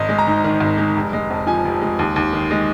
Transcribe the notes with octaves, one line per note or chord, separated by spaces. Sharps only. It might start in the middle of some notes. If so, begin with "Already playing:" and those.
Already playing: G#1 D#5
G#3
A#5
G#2
D#3
G#1
G#3
F1
G#3
F2
F3 G#5
F1
G#3
D#2
D#2
D#3
G#3